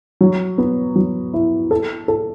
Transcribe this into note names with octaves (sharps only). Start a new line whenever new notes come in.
F#3
B3
F#3
E4
A4
A4